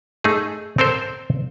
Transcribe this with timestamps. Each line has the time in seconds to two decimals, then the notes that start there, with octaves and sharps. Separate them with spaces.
0.24 A3 D#4 G#4
0.78 C4 A4 A#4 C5